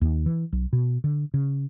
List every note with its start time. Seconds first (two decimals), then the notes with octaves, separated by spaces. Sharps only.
0.01 D#2
0.26 E3
0.53 B1
0.73 B2
1.04 D3
1.34 C#3